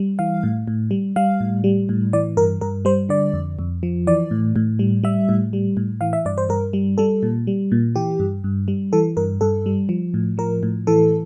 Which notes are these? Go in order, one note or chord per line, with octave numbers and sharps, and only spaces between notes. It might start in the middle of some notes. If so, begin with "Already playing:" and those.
Already playing: G3
E3 F5
A2
A2
G3
G3 F5
A2
G3
A2
E3 D5
G2 A#4
G2 A#4
G3 C5
D3 D5
F2
F2
F3
E3 D5
A2
A2
G3
G3 E5
A2
G3
A2
E3 F5
E5
G2 D5
C5
G2 A#4
G3
G3 A4
A#2
G3
A#2
E3 G4
G2
G2
G3
E3 A4
G2 A#4
G2 A4
G3
F3
A2
F3 A#4
A2
E3 A4